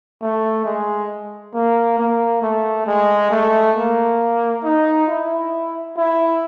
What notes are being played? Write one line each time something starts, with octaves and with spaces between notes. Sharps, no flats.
A3
G#3
A#3
A#3
A3
G#3
A3
A#3
D#4
E4
E4